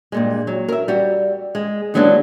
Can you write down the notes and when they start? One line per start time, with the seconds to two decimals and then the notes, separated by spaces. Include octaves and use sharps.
0.12 G2 A#2 G#3
0.47 F#3
0.69 A#4 E5
0.88 G3 F#4
1.55 G#3
1.94 D#2 E3 F#3 G#3 B3 D4